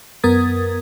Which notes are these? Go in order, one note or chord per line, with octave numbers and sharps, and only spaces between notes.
F#2 B3 A#4 D#6 G#6 A6